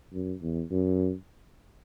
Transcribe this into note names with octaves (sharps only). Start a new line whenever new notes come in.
F#2
E2
F#2